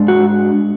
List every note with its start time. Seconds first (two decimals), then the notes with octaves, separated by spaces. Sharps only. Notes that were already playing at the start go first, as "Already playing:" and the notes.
Already playing: G#2 G#3 D4
0.08 F#4